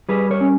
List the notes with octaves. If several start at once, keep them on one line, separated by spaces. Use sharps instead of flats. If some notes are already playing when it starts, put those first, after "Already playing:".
G3 G#4 B4
A#4 C#5
C#4